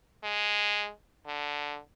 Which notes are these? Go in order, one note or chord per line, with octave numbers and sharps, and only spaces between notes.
G#3
D3